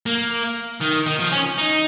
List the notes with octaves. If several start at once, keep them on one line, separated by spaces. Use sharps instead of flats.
A#3
D#3
D#3
F3
C#4
D#4